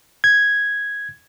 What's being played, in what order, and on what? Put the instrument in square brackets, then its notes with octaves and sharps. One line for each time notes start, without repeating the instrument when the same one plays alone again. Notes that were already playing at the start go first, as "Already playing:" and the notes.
[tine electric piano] G#6